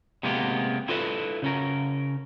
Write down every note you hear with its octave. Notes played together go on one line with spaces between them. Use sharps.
C3 G#3 A#3 B3 G4
E4 F4 A4 B4 D#5 E5
C#3 C#4 A#4